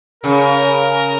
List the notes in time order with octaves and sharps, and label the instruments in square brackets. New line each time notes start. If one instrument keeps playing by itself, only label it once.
[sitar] C#3 [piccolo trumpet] A#4